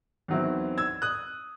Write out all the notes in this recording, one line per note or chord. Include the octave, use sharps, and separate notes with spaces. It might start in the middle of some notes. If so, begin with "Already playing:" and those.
E2 D#3 F#3 C4 E4
E6 G#6
D#6 F#6